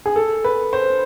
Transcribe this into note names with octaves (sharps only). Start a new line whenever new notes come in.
G#4
A4
B4
C5